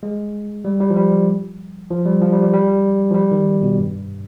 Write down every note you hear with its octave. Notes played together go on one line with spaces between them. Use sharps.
G#3
G3
G3
F3
G3
F3
G3
F3
G3
G3
G3
F3
G3
D#3
B2
G2